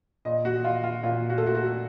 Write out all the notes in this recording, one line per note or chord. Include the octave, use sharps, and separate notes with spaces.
A#2 D#5
F#4
A#2 F4
F4
A#2 F4
F#4
A4
A3 F#4
F#4